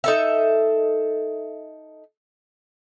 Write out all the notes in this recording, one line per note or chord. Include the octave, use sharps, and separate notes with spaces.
D#4 A4 E5